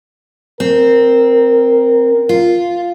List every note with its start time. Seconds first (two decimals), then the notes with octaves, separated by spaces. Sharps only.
0.60 C4 A#4
2.29 F4